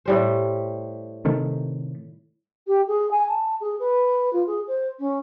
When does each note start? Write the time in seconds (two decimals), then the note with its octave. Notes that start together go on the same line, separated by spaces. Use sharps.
0.05 A2 G3 C5
1.25 C3 D#3 A3
2.67 G4
2.87 G#4
3.11 G#5
3.28 A5
3.60 G#4
3.79 B4
4.33 F4
4.47 G#4
4.67 C5
4.99 C#4